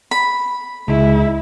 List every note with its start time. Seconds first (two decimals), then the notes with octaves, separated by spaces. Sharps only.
0.11 B5
0.88 C#2 G#3 E4